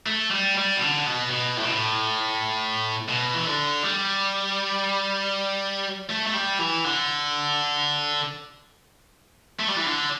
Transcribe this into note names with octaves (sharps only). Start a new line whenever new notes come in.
A3
G3
G3
B2
D3
B2
B2
A2
B2
A2
B2
E3
D3
G3
A3
A3
G3
E3
D3
A3
G3
E3
D3